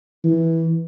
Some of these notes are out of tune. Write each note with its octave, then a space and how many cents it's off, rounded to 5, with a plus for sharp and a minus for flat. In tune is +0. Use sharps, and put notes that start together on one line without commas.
E3 -10